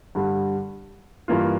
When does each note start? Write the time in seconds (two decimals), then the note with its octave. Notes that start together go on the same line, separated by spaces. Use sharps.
0.15 G2 D3 G3
1.28 G2 E3 A#3 F4